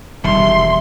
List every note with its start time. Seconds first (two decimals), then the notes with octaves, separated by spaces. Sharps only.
0.24 E1 D#3 G3 E5 C6